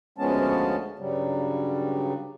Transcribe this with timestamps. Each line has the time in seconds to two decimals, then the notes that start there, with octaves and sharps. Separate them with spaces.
0.18 D2 F3 G#3 B3 C#4 A5
0.99 G2 C#3 F#3 G3